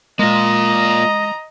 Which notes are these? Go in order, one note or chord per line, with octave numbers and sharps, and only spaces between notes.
G#3 A#3 F4 D#5 A#5